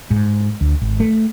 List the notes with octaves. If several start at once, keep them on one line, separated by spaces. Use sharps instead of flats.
G#2
D2
G#1
A3